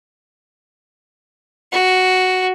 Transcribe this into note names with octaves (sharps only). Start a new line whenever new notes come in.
F#4